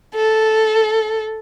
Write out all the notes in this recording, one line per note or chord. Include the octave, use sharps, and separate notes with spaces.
A4